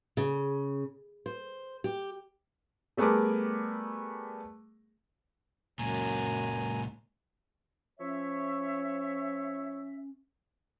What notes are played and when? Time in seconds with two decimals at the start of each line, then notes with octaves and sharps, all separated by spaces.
0.17 C#3
1.26 C5
1.84 G4
2.97 G3 A3 B3 G#4 A#4 D6
5.79 C#2 F#2 A#2 G#5 A#5
8.00 F3 C#4 C#5 E5